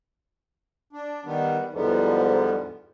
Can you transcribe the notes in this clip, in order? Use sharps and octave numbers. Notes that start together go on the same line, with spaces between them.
D4
D#3 G3 B3
E2 G#2 D3 F3 G3 B3